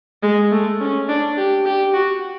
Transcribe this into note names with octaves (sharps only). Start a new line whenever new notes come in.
G#3
A3
C#4
D4
G4
G4
F#4